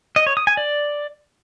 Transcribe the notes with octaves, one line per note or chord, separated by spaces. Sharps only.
D#5
C#5
D#6
G#5
D5